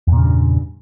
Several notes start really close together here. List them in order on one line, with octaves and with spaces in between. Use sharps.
E2 A#2 C#3 G2